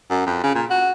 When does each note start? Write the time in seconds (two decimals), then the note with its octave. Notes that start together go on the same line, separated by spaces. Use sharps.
0.10 F#2
0.26 F2
0.44 C#3
0.55 A#2
0.70 F#4